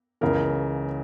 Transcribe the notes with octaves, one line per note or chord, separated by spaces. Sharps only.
C#2 C#3 E3 A#4